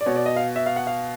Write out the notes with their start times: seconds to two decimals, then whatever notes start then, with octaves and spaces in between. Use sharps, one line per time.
0.01 D5
0.06 B2 C#5
0.16 D5
0.26 D#5
0.36 F5
0.56 E5
0.66 F5
0.76 F#5
0.87 F5